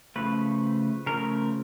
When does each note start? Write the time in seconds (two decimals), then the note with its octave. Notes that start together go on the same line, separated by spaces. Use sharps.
0.16 C#3 F3 A3 B4
1.06 C#3 F3 A3 A#4